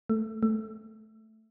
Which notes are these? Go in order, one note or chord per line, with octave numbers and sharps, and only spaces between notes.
A3
A3